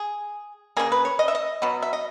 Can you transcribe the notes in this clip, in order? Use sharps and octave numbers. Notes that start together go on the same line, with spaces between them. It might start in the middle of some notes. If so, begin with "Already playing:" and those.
Already playing: G#4
C#3 F#3 A#3 G#4
B4
C#5
D#5
E5
D#5
B2 F#3 B3
E5
D#5